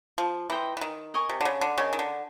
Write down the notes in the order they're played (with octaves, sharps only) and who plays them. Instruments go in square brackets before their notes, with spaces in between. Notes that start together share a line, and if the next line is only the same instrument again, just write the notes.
[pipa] F3
[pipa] E3 [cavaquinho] C5 D#5 G5 A#5
[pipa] E3
D#3
[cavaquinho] A#4 D#5 G#5 C#6
[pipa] C3
D3
C#3
D3
[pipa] C#3 [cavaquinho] A#4 D#5 G#5 C#6
[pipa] D#3
D3